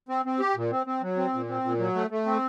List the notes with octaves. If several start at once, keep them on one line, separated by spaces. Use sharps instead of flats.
C4
C4
G4
A#2
C4
C4
F#3
C4
A#2
C4
A#2
F#3
A3
A3
C4